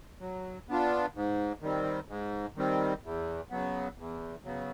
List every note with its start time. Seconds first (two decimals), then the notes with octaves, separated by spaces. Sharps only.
0.20 F#3
0.69 B3 D4 F4
1.15 G#2
1.62 D#3 G3 C4
2.08 G#2
2.56 D#3 G3 C4
3.03 E2
3.50 C#3 F#3 B3
3.98 E2
4.44 C#3 F#3 B3